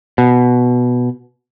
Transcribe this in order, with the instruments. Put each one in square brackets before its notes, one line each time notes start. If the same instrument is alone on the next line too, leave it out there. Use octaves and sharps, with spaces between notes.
[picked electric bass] B2